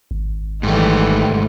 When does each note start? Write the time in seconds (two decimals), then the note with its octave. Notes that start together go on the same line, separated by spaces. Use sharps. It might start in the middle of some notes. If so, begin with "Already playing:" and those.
0.11 G#1
0.63 G#2 D#3 E3 G3 A3